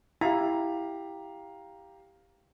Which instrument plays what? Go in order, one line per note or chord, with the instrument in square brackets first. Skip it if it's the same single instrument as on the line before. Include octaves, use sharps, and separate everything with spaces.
[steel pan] E4 [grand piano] G4 F5 A#5